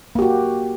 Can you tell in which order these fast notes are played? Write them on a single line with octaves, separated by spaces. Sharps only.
A#3 G4 F#4